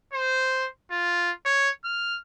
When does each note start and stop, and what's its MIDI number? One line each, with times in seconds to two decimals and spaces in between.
0.13 0.67 72
0.91 1.31 65
1.46 1.70 73
1.85 2.18 89